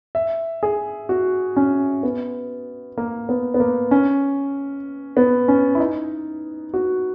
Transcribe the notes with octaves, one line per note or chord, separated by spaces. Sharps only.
E5
G#4
F#4
C#4
B3
A#3
B3
B3
A#3
C#4
B3
C#4
E4
D#4
F#4